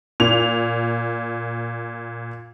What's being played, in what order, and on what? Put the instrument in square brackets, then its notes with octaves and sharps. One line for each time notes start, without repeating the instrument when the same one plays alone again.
[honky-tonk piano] A#2 F7